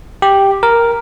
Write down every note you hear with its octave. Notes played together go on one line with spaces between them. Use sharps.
G4
A#4